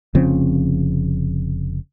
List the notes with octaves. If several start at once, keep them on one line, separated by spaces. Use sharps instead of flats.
F1 C#3 F3 C4